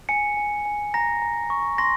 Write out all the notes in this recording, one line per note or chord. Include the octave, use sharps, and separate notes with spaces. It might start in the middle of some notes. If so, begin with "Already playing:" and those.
G#5 C#7
G#5
G#5
A#5 A#6
A#5
C#6
C6 A#6